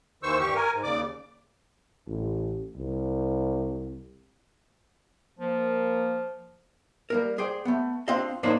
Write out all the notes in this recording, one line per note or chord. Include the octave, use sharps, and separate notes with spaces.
D#2 D#3 E3 C5 C#6 E6
G2 G4 C#6
A#4 G#5
G#2
D#2 C#3 D5 D6
A1
C2
F3 A#3
G3 A#3 A#4
G#4 C5 D5 G5
A3 B3
C4 D4 F4 C5 D#5 F5
E2 A2 A#3 D4 D#4 C5